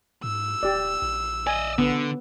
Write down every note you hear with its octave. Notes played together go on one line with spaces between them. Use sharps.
G#2 E6
D#1 G4 D5
A#1
D5 D#5 G#5
D3 B3